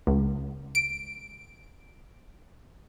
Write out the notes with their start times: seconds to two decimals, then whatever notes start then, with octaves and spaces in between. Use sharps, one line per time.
0.07 C#2
0.75 D7